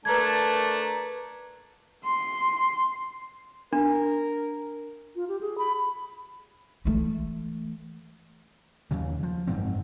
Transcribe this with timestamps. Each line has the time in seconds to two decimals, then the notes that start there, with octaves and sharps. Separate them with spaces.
0.05 A3 D4 A#4 B4 A#5 G#6
2.05 C6
3.73 D4 A#4
5.16 F4
5.29 G4
5.41 G#4
5.58 B5
6.85 E3 A3
8.91 D#2 C#3 F#3
9.23 F3
9.47 F#1 G#2 C4